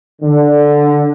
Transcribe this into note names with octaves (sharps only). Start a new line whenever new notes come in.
D3